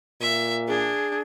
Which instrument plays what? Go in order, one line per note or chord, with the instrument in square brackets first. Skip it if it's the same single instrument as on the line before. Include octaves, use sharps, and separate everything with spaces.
[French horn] A#2 [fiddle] E5
[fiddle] D4 [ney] G#4